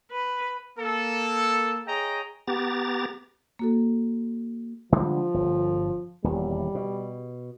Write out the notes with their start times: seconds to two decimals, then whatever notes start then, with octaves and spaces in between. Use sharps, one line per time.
0.12 B4
0.78 A#3 A4
1.87 G#4 C#5 D#5 G5 A#5
2.47 B3 G4 A#5 A6
3.59 A#3 F#4 A4
4.92 D3 F3 G3 G#3
5.34 G1
6.24 D#1 E2 G3
6.75 B2